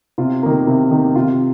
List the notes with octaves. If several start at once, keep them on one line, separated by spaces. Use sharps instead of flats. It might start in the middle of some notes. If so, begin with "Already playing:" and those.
C3 F4
D#3 A#3
C3
D#3 A#3
C3 F4